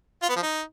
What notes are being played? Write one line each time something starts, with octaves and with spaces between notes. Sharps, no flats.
F4
B3
F3
D#4